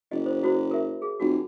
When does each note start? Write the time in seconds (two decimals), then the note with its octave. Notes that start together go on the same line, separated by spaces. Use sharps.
0.11 F#1 D#5
0.26 C5
0.43 E4 F#4 C5
0.71 A#4 E5
1.02 G#4
1.20 F1 F#4